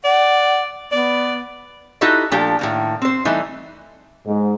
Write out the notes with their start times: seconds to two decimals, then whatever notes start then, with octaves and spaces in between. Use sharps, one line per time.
0.04 D5 F#5
0.92 B3 D5
2.01 D#4 E4 F#4 G4 A4 D#5
2.31 A#2 F3 A3 D4 G4 A4
2.59 A2 D#3 A#3
3.02 C4 C5
3.25 E3 G3 A3 D#4
4.26 G#2